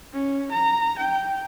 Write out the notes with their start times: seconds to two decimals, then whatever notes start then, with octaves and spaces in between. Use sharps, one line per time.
0.13 C#4
0.52 A#5
0.99 G5